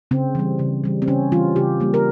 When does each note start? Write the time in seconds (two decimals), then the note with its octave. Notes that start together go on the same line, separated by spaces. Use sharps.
0.11 C#3 C4
0.35 E3 G3
0.59 C#3
0.84 E3 G3
1.02 C4
1.07 C#3 C#4
1.32 E3 G3 F4
1.56 C#3 G4
1.80 G3 A#3
1.94 A#4